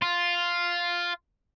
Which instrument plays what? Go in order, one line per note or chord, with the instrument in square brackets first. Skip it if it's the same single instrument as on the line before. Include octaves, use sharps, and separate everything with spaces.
[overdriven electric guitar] F4